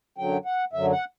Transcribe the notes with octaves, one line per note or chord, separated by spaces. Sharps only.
F#2 D3 F#3 G5
F#5
F#2 D3 F#3 E5
F#5